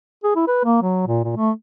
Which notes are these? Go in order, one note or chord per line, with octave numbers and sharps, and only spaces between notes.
G#4
E4
B4
A#3
F#3
A#2
A#2
A3